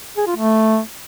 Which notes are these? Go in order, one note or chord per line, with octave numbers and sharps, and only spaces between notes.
G#4
F4
A3